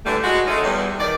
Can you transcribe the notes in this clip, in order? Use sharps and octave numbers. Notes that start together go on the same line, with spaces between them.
A2 D3 E3 G3 A3 D4
G#3 F#4
C#3 G#3 A3 C#4 D#4
E2 G3
D#3 D5